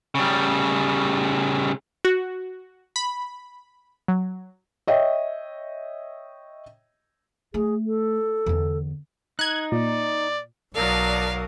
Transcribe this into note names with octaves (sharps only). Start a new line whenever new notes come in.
C#3 G3
F#4
B5
F#3
C#5 D#5 E5 G5
A3 G#4
A4
E2 D3
D#4 F#6 G#6
A#2 D5
B1 F#3 A#4 D5 F5 A5 D#6